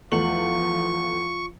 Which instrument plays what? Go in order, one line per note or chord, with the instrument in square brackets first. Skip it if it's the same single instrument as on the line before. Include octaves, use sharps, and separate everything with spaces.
[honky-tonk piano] E2 A3 F#7 [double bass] F3 [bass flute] F4 [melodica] C#6